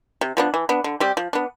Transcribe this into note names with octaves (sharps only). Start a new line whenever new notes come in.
C3
F3 B3 D4
E3
B3 D4
D3
G3 C4 G4
F3
B3 D4